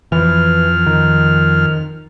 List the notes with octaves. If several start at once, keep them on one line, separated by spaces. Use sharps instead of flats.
F2 E3 F6
D#3